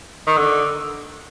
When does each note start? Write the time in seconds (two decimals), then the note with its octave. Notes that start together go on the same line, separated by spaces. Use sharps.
0.27 D#3
0.37 D3